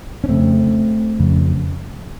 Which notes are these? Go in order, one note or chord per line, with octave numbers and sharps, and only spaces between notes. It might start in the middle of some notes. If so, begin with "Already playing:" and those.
C#4
F2 C#3 A3 C4
F2 C#3